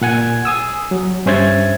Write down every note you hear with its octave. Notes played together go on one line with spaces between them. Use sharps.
A#2 F#5 G#5 G#6
G#5 D#6 E6
F#3
G2 C#4 C5 E5 G#6 A6